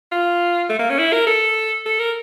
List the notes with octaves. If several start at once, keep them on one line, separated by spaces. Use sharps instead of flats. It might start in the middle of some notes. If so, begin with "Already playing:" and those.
F4
A3
A#3
C#4
E4
A#4
A4
A4
A#4